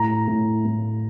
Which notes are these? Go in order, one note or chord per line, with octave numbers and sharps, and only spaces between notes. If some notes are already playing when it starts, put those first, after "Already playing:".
Already playing: A2 A#5
A2
A2